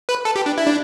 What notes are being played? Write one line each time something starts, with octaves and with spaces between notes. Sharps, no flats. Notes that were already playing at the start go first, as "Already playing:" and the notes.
B4
A4
G4
D4
E4
D4